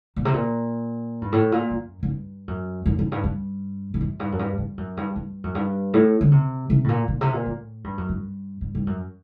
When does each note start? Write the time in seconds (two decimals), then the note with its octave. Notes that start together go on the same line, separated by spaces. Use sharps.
0.16 A#2
0.25 C3
0.34 A#2
1.21 G2
1.32 A2
1.52 A#2
1.70 F#2
2.03 F#2
2.08 G2
2.48 F#2
2.86 F#2
2.99 F#2
3.12 G2
3.24 G2
3.94 G2
4.01 F#2
4.20 G2
4.32 F#2
4.39 G2
4.58 G2
4.78 F#2
4.97 G2
5.16 G2
5.44 F#2
5.55 G2
5.94 A2
6.21 D3
6.31 C3
6.70 C3
6.84 A2
6.89 A#2
7.08 A#2
7.21 C3
7.33 A#2
7.46 A2
7.84 G2
7.98 F#2
8.09 G2
8.61 G2
8.75 G2
8.87 F#2